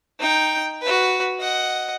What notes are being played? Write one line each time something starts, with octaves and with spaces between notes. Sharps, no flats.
D#4 G5
F#4 B4
D#5 F#5